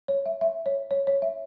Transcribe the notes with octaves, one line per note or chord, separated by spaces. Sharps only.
C#5
E5
E5
C#5
C#5
C#5
E5